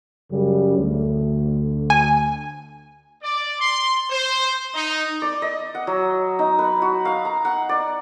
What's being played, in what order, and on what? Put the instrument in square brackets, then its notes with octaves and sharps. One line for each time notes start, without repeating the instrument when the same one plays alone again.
[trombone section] F#2 C#3 G3
D2
[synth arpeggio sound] G#5
[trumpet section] D5
C6
C5
D#4
[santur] D5
D#5
F#5
F#3
D#4
B4
F#4
F5
A#5
F#5
D5